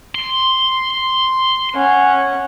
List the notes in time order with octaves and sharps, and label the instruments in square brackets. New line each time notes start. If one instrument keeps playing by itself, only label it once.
[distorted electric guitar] C6
[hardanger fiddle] C#4 F#5